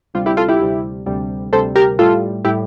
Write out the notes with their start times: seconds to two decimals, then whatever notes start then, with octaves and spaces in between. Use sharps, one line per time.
0.14 D2 C3 G3 F4
0.26 E4 G4
0.37 F4 A4
0.48 E4 G4
0.60 D2 C3 G3
1.06 D2 C3 G3
1.53 D2 C3 G3 A4 C5
1.76 G4 A#4
1.99 A2 G3 F4 A4
2.45 A2 G3 E4 G4